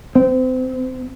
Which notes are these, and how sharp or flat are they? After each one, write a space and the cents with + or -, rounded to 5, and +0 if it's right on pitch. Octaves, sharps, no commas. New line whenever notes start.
C4 -30